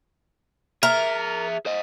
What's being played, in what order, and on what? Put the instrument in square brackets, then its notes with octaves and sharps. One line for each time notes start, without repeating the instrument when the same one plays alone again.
[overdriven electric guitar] G#4 E5 [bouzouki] A#4
[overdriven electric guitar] C5 D#5